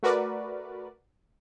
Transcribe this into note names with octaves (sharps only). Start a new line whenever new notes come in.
A3 F#4 A#4 B4 D5